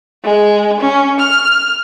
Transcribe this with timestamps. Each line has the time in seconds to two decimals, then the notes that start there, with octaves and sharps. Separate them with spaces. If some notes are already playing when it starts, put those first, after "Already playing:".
0.24 G#3
0.81 C#4
1.20 F6